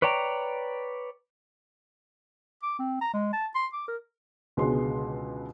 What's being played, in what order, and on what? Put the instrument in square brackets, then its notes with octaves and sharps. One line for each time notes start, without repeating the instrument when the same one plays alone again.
[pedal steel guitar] B4 C#5 D5 G5 A#5
[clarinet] D6
C4
A#5
G#3
A5
C6
D6
A#4
[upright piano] C#2 B2 D3 G#3 B3 C6